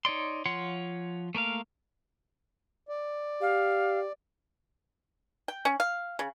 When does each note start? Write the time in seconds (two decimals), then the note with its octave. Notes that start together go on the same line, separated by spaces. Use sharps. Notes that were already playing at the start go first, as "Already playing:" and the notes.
0.05 D#4 C#5 D5 C6
0.46 F3 F4 C#5 F#5 C6
1.35 A3 A#3 A#4 F5
2.89 D5
3.41 G4 F5
5.48 G5
5.65 C#4
5.80 F5
6.19 C#3